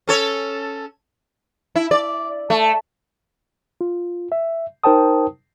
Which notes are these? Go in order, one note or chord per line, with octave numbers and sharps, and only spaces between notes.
C#4 A4 C#5
E4
D5
A3
F4
E5
D#4 A#4 C5 G5 A5 D#6